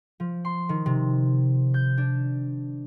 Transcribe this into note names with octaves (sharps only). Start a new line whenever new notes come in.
F3
C6
D#3
C3
G6
D4